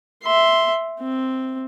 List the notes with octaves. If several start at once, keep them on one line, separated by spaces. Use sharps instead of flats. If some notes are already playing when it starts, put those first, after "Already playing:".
E5 C6
C4